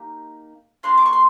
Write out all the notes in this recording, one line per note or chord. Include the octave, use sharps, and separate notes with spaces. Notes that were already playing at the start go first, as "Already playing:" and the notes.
Already playing: A#3 D#4 G4
A#3 D4 F4 C6
D6
C#6
C6